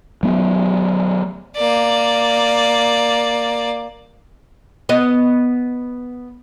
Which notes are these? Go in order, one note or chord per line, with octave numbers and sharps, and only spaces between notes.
F#3 A3 B3
A#3 D5
B3 D#5